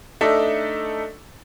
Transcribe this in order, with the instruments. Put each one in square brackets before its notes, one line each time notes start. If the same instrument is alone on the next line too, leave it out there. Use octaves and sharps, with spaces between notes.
[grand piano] A3 D4 D#4 A4 E5